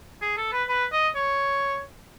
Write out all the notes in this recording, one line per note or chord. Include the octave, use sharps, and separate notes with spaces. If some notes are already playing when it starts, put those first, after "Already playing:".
G#4
A4
B4
B4
D#5
C#5